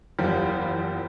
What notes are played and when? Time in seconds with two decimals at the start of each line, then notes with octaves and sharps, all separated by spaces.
0.19 F#1 E2 F3 G3 F4